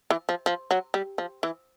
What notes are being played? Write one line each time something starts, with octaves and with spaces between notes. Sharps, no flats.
E3
F3
F3
F#3
G3
F3
E3